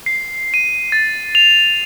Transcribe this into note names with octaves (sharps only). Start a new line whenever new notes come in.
C7
D#7
A6
F7